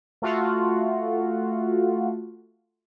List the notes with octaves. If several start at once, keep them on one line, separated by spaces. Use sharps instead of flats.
A3 F4 F#4